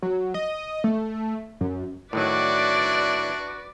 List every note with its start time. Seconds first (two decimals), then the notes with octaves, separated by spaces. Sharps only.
0.02 F#3
0.34 D#5
0.84 A3
1.61 F#2
2.13 A2 D#3 F#3 D4 E4 F#4 B4 D5